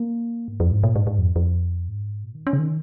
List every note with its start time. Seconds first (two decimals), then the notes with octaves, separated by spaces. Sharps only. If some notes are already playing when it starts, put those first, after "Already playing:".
Already playing: A#3
0.48 G#2
0.60 F2
0.72 G#2
0.84 A#2
0.96 G#2
1.07 G#2
1.18 F2
1.36 F2
1.89 G#2
2.24 A#2
2.35 D#3
2.47 C#4
2.53 C#3
2.59 D#3